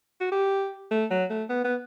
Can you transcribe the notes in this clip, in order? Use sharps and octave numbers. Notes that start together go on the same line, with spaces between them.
F#4
G4
A3
F#3
A3
B3
B3